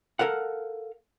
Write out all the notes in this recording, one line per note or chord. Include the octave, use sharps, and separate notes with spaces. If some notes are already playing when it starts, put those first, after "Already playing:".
A4 A#4 F5 F#5